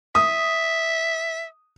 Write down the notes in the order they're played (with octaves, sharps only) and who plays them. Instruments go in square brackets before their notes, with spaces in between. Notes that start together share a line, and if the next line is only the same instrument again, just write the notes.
[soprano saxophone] E5 [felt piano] D#6